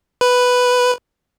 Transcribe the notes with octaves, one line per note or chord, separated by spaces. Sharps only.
B4